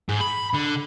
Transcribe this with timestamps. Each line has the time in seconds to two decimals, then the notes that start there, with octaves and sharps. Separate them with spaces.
0.09 G#2
0.21 B5
0.54 D3